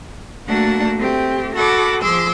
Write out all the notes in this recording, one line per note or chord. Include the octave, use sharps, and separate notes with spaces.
A3 A#3 D4 F#4 F#5 A5
A3 C4 G4
F#4 A4 F#5 B5 D6
F3 G#4 C6 D6 E6